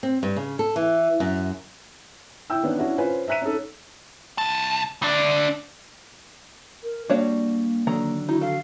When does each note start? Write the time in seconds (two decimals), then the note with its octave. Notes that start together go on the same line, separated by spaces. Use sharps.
0.03 C4
0.23 G2
0.36 C#3
0.59 A4
0.76 E3
1.20 F#2
2.50 E4 G5 E6
2.63 D#3 E3 B3 C#4 D4
2.79 C#4 D4 E4 F#4
2.98 C#4 F4 B4 C5 G#5
3.28 E5 A#5 F#6 B6 D#7
3.42 C#4 D#4 A4
4.38 C2 A5
5.02 D2 D4
6.83 A#4
7.10 G3 A#3 D4 F#4 C#5 F5
7.87 D3 D#3 F#3 A#5
8.29 D#4 E4 F#4
8.41 A4 F5